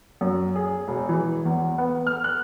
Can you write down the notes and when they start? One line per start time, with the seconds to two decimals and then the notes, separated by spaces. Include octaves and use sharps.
0.21 F#2
0.56 G#4
0.88 E1
1.09 E3
1.45 E2
1.78 B3
2.07 F6
2.24 F#6